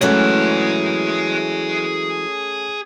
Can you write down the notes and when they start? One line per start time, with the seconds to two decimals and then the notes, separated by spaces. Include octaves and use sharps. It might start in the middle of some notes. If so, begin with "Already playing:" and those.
0.01 E3 F#3 G#3 A3 C#4 G#4 F#5